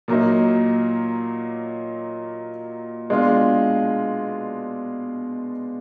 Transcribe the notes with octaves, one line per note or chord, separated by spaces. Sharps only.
A#2 F#3 A#3 D#4
B2 G#3 D4 F4